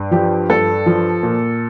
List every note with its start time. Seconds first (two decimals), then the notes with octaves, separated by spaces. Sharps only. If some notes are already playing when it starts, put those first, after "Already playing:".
Already playing: G2
0.11 F3 G4
0.50 G2 A4
0.86 F3
1.23 A#2